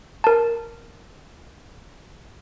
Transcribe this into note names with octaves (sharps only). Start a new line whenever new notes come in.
A#4 A5